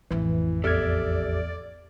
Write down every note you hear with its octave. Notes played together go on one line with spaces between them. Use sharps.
A1 F2 E3
E2 G4 A4 D5 E5 F6 G#6